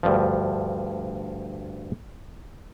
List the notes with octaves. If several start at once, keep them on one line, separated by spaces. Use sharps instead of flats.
D2 G2 F3